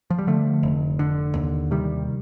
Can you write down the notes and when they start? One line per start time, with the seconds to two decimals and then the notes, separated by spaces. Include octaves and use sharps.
0.10 F3
0.19 G3
0.27 D3 F3 A3
0.63 F1
0.99 D3
1.35 D#2
1.71 C3 D#3 G3